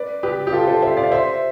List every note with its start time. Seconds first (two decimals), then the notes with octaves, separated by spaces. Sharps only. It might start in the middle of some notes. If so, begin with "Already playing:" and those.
Already playing: B4 D5
0.23 G4 B4
0.47 G4
0.53 F4 A4
0.67 A4 C5
0.82 C5 E5
0.97 D5 F5
1.12 C5 E5